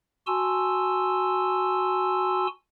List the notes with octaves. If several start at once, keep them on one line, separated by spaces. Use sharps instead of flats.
F#4 G#5 A5 C6 E6